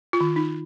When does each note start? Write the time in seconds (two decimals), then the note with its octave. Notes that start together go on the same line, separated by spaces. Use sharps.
0.13 F4
0.21 D#3
0.36 D#4